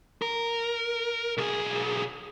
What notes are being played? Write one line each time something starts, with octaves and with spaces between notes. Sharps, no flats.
A#4
B1 G#4